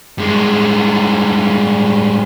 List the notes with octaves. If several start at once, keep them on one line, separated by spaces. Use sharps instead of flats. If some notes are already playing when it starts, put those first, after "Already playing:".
G2 G#3